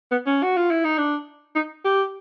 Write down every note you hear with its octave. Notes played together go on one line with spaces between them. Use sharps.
B3
C#4
F#4
F4
E4
D#4
D4
D#4
G4